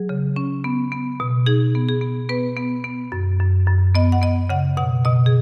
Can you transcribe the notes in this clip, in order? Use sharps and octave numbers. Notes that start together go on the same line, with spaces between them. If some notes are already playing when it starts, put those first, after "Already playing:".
Already playing: F#3 G#4
C#3
C#4
B3
B3
B2
D#4 G#4
B3
G#4
B3
B3 B4
B3
B3
F#2
F#2
F#2
B3 D#5
F#5
B3 D#5
C#3 F#5
B2 F#5
B2 D#5
G#4